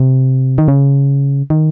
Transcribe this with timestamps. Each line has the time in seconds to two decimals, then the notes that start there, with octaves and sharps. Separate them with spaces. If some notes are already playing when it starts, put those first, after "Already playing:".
Already playing: C3
0.58 D#3
0.68 C#3
1.50 D#3